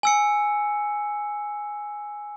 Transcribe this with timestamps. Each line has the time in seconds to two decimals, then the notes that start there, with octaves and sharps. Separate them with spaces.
0.03 G#5 E6 C#7